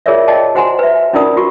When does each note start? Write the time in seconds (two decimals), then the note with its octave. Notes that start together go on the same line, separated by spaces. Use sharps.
0.06 F4 G#4 A#4 C#5 D5 E5
0.28 D5 D#5 G5 A5
0.55 F#4 C5 F#5 G#5 A#5 C6
0.79 B4 E5
1.13 C#4 D#4 F4 A#4 D5 D#6
1.37 F4 F#4 C#6